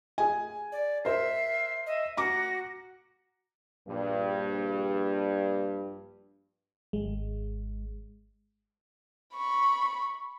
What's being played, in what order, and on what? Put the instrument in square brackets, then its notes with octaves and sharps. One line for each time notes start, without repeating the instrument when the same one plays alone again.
[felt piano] G#4 G#5
[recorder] D5
[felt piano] A#4 C5 [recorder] E5 [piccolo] C7
[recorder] D#5 [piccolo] E5
[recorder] F#4 [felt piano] A#5 D6 [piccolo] A#6
[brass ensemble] A#1 G2
[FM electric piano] G#1 G#3
[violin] B5 C#6